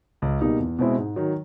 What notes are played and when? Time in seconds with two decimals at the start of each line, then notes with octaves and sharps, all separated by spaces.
0.22 C#2
0.41 B2 G3 A#3 D#4
0.60 E2
0.79 B2 G#3 C4 E4
0.98 G#2
1.16 D#3 F#3